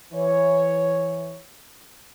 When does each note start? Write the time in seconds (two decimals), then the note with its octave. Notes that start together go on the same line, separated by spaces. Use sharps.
0.13 E3 C#5